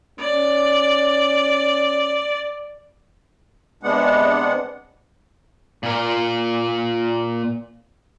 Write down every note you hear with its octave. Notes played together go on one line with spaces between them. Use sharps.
C#4 D5
C3 G#3 B3 D4 F#5
A#2 A#4